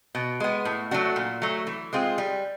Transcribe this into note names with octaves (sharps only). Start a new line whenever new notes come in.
B2
G#3 B3
A2
F#3 A3 D4 F#4
A#2
F#3 A3
E3
G#3 C4 F4 G#4
G3